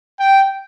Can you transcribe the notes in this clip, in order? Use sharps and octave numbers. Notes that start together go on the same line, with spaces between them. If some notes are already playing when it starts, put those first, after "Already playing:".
G5